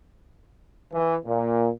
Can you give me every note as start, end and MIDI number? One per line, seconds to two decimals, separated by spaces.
0.92 1.16 52
1.26 1.70 46